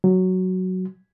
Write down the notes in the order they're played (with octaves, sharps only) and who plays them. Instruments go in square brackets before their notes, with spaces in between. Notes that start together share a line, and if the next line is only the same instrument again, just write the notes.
[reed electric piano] F#3